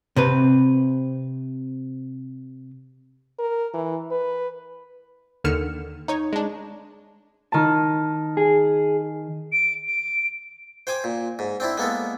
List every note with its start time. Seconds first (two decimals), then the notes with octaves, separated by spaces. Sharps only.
0.16 C3 C4 B4
3.39 A#4
3.74 E3
4.11 B4
5.44 D#2 D3 D#3 F6 C#7 E7
6.08 D#4 C#5 C#6
6.33 G#3 D4
7.52 D#3 A5
8.37 G#4
9.53 D7
9.86 D7
10.87 C5 G5 G#5 D6
11.04 A#2
11.39 G#2
11.60 C4 D4 E4
11.78 G#3 A#3 B3 A4